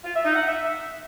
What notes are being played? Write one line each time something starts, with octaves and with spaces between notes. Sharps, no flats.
F4
E5
D#4
F#5
E5